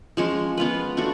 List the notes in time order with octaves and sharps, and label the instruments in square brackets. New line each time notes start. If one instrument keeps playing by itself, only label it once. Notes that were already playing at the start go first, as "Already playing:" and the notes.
[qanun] F3 G#3 C#4
B3 F4 B4
A3 D4 F#4